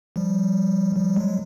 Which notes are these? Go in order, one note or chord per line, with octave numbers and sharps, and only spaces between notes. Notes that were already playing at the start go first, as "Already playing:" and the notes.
F3 G3
F3 G3
F#3 G#3